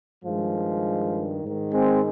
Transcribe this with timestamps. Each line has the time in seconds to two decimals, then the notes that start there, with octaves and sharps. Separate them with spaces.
0.24 G2 D#3 F3 G#3
1.43 G#2 D#3
1.72 G#3 C4